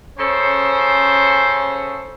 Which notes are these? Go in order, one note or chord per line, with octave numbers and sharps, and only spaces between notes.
C#3 C#4 A4 C5